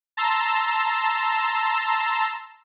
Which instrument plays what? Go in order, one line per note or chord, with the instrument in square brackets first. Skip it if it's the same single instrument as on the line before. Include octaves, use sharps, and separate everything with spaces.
[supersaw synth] A5 A#5 C6 E6